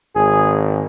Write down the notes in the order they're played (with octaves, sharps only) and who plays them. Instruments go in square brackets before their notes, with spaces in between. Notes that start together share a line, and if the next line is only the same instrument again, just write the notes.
[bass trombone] G#1 [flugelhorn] G#4